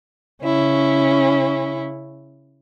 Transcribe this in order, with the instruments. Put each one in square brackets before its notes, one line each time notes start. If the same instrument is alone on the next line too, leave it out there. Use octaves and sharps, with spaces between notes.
[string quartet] C#3 C#4 E4